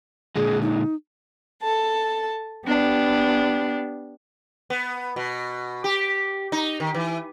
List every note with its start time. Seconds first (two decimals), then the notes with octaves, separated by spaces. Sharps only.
0.36 A#2 D3 G#3 G#4
0.62 D#4
1.62 A4 A5
2.66 B3 D4 G4
4.70 B3
5.16 B2
5.84 G4
6.52 D#4
6.80 D#3
6.95 E3